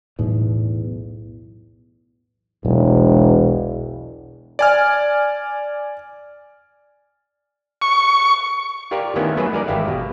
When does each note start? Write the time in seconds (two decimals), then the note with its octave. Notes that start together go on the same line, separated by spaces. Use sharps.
0.19 B1 E2 A2
2.65 E1 B1
4.59 D5 G#5 F6
7.82 C#6
8.91 F4 G4 A#4 D5
9.16 D#3 A3 B3 C#4 E4
9.37 F#3 A3 G#4 B4
9.53 G#3 A#4 D5
9.68 G#1 E3 E4 G4 F5
9.88 B2